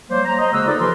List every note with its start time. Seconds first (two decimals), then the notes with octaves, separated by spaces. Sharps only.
0.10 F#3 G3 A#3 C5
0.25 A#5
0.38 C5 D#5
0.51 C#3 G#3 A#3 F#4 E6
0.66 D#4 F4 A4 B4 D5
0.79 E3 F3 G4 A#4 B4 C6